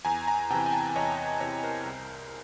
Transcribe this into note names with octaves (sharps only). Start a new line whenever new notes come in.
E2 G#5 A#5
G#5 A#5
C3 E3 G5 A5
G#5
G5 A5
E2 C#5 D#5
C3 E3 B4 C#5
A#4 C5
C2